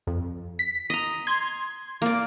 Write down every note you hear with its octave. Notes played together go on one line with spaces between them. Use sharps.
F2
B6
D#5 A#5
C6 G#6
A#3 D5